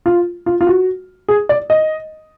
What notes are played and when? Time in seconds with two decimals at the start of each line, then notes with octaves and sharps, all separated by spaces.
0.06 F4
0.46 F4
0.61 F4
0.67 F#4
1.28 G#4
1.49 D5
1.70 D#5